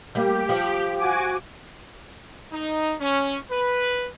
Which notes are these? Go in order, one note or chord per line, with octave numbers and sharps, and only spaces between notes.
G3 A#3 G4
F3
F#4 G#5 D6
D#4
C#4
B4